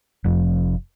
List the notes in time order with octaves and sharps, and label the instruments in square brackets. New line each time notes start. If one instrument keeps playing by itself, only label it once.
[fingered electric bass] F1 F2